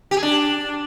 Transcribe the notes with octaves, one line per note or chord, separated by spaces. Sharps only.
G4
G#4
D4